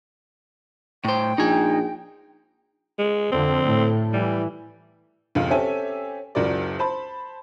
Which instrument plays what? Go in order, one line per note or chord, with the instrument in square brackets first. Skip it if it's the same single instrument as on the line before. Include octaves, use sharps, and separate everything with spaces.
[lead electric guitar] A2 C5 [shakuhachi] G5
[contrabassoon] A#1 [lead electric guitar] D#4 G#5
[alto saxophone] G#3
[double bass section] F2 D3 [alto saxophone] C4
[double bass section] A2
[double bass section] E3 [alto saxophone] G3
[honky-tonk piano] F1 C#2 F5
C4 C#4 G4 A4 E5 G#5
F#1 C#2 F#4 A#4 D5
C5 A5 B5